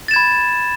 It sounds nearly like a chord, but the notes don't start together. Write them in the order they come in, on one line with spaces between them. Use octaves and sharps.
A6 E7 G#6 B5